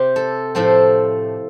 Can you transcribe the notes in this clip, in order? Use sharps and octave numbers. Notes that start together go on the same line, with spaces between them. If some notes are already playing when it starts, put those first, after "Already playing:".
Already playing: C3 C4 G4
A4
A2 F3 A3 C4 A4